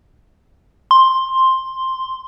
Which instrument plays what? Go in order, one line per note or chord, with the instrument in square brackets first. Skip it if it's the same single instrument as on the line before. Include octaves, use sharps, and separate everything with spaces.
[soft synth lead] C6